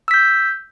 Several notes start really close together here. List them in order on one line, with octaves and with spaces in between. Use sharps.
E6 B6 G6